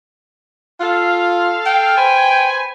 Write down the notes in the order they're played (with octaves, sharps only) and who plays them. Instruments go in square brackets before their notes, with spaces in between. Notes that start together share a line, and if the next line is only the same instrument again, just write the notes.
[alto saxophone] F4 [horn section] A4 F5
[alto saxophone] G5
[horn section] B4 C5 G#5